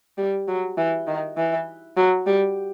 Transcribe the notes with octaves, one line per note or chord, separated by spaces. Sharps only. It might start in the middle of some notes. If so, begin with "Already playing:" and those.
G3
F#3
E3
D#3
E3
F#3
G3